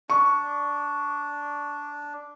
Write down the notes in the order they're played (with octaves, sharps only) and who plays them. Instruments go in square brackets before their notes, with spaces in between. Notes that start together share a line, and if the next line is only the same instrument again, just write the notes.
[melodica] D4 [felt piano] C#6